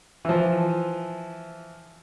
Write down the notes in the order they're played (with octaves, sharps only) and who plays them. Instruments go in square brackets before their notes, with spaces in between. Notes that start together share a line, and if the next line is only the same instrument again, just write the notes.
[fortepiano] E3 F3